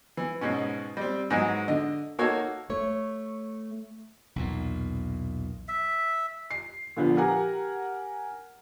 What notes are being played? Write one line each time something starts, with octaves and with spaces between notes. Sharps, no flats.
E3
G#2 B2 C#4
G3 C4
G#2 E3 F#3 G#3 F#4
D3 D#5
A#3 D#4 F#4 A4 C#5
A3 C#5
B1 E2 A#2
E5
C7
A#2 D3 F3 B3
G4 A#4 F#5 G#5 A#5